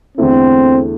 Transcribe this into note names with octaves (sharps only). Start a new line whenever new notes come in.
E2 D3 A3 C4 E4 A4